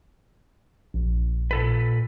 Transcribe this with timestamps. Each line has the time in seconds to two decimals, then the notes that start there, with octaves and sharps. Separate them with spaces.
0.94 A#1
1.51 A#2 A4 B4